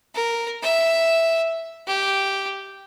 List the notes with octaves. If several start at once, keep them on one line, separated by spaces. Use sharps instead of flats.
A#4
E5
G4